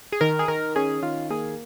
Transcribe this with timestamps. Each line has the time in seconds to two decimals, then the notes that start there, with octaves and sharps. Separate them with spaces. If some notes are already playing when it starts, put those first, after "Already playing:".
0.12 G#4
0.21 D#3 A#4
0.39 G#4
0.48 D#3 A#4
0.76 C#4 G#4
1.03 D#3 F4
1.31 A#3 G#4